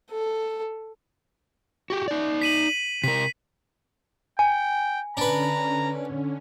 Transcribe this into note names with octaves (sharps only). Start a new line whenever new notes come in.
A4
F#4 G4
D#4 D5
B6 D#7 F#7
C3 A#4 B6
G5 G#5
D3 C#4 D4 B4 A#5